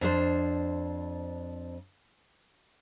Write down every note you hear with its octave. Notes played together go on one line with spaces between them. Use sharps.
F2 D4 C5